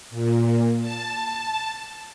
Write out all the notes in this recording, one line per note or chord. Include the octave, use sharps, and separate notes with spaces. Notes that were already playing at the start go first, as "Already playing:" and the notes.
A#2
A5